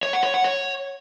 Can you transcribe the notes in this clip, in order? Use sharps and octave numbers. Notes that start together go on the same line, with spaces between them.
C#5
F#5
C#5
F#5
C#5